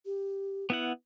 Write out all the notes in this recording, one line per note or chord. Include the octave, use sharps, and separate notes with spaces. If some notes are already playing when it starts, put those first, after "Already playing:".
G4
B3 E4 F#5